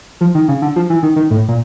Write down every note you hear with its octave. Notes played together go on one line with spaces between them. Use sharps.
F3
D#3
C#3
D3
F3
E3
D#3
D#3
A2
A#2